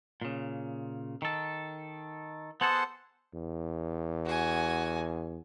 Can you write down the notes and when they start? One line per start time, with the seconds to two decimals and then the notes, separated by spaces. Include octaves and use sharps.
0.22 A#2 C#3
1.22 D#3 A4
2.61 B3 G#4 A4 C5 F#5 A5
3.34 E2
4.25 F#4 G#5